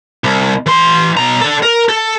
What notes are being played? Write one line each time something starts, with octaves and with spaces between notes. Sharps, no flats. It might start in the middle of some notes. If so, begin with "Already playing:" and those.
C2
E3 C6
B2 A#5
A4 D5
A#4
A4